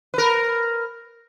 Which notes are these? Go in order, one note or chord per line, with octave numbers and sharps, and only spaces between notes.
A#4 B4